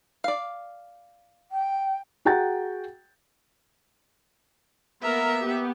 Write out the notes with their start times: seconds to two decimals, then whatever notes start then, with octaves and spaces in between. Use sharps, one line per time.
0.24 D5 F5
1.51 G5
2.25 F#4 G#4 F#5 G5 A#5 A6
5.02 A#3 B3 A#4 E5
5.40 B3 G4